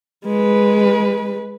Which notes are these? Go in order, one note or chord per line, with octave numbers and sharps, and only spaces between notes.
G#3 B4